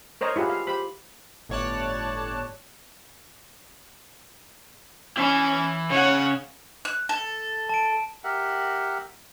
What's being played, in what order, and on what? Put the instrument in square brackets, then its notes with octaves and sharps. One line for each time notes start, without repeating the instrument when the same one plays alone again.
[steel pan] A#4 C5 C#5 D#5 A#5
E4 F4 G4 G#4 F#5
F5
G4 C5 B5
[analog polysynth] G1 A2 C#5 D5 A5 F#6
[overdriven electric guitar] E3 [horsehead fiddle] C#4
[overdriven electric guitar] C#3 [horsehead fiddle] C#5 F#5
[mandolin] F#6
A4
[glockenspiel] A5 D7
[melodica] G4 A#4 E5 F#5